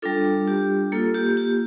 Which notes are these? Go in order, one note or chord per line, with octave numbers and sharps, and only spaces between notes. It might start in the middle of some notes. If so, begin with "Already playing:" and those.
G3 D4 F4 A4
G4
A#3 F4 A4
G4
G4